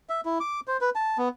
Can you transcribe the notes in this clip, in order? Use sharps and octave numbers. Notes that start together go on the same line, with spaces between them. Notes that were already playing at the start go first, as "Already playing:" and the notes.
E5
E4
D6
C5
B4
A5
B3